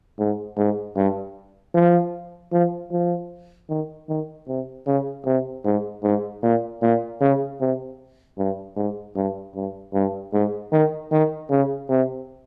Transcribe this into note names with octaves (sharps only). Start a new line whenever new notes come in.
G#2
G#2
G2
F3
F3
F3
D#3
D#3
C3
C#3
C3
G#2
G#2
A#2
A#2
C#3
C3
G2
G#2
G2
G2
G2
G#2
D#3
D#3
C#3
C3